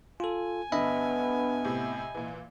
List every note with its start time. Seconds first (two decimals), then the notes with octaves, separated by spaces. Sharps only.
0.20 F4 A4 G#5
0.72 G2 D3 B3 D#5 E5 B5
1.64 A2 C3
2.15 A#2 E3